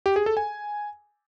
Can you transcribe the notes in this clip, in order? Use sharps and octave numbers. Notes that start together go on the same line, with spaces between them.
G4
G#4
A4
G#5